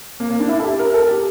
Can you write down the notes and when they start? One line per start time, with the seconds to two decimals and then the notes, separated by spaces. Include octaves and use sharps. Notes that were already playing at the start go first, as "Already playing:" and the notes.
0.20 A#3
0.30 A#3
0.40 D4
0.49 E4
0.60 A4
0.64 G4
0.79 A#4
0.90 A#4
0.94 A4
1.09 G4